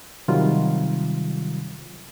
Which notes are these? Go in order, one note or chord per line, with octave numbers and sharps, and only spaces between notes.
C3 D#3 F#3 G3 F4